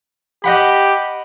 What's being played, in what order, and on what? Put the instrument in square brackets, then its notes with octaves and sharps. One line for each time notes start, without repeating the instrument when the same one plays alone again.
[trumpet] G4 [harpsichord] D#5 F#5 B5